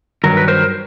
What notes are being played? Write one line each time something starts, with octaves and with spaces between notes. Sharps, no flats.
G2 D#3 F#3 A#4
B4
A#4 C5